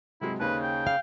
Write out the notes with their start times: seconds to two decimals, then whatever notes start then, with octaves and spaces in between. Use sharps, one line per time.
0.21 C3 F#3 G#3 E4
0.40 D#2 C#3 D#4 B4 C5
0.63 G5
0.87 F5